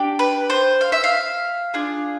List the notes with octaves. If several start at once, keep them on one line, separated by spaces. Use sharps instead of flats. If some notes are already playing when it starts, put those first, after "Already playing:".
Already playing: D4 G4
B4
C5
F5
E5
F5
D4 F4 G#4